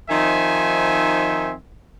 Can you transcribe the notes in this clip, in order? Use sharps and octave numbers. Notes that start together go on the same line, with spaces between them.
D#3 F3 C4 D#4 E5 G#5